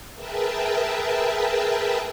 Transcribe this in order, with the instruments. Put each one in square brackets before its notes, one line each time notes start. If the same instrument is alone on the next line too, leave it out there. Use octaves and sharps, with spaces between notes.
[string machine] G#4 A#4 B4 E5 G5 A5